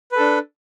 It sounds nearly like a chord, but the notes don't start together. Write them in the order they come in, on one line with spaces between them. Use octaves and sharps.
B4 A4 D4